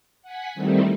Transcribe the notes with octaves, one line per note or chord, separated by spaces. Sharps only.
F#5 G#5 B6
D#3 G3 A3 C4 D#4 E4